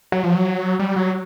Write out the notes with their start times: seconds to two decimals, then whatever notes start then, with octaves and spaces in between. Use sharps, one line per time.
0.12 F#3
0.24 F3
0.35 F#3
0.79 G3
0.96 F#3